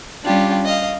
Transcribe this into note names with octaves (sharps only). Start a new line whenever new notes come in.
G3 C#4 D4 F4 G4
D#5 F5